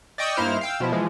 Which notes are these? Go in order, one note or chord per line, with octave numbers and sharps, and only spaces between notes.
D5 D#5 G5 C#6 D#6 E6
G2 A#3 D#4 E4 C5 F6
F5 G5 E6
B2 F3 E4
E3 F3 G#3